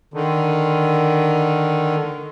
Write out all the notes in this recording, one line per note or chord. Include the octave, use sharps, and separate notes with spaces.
D3 D#3